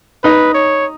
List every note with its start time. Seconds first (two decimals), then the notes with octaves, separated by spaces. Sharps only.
0.24 D#4 B4
0.54 C#5